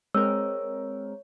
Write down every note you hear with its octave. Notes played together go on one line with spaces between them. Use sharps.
G#3 C4 A#4 C#5 E6